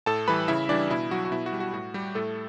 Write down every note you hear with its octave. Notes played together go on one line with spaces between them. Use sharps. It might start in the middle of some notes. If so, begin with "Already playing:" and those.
A2 A4 A5
E3 G3 B4 B5
C#3 E4 E5
E3 G3 D4 D5
B2 E4
F#3 F#4
F#4
B2 E4
F#4
G3
F#4
A2 F#4
G3 G4
A2 A3 A4